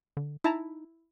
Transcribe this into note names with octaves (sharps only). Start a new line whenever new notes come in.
D3
D#4 E4 A5 A#5